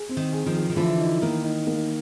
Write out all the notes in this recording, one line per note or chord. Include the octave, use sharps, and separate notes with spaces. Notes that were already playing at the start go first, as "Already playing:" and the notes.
Already playing: G#4
C4
D#3
G#4
D#3 F3
G#4
D#3
D3 E3 F3
D#4
D#3 A#3
D#4
A#3